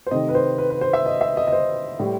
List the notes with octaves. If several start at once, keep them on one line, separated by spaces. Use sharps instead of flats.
C5
C3 D#3 A3 D#5
B4
C5
B4
B4
C5
E5
D#5
E5
D#5
D#5
C5
A2 G3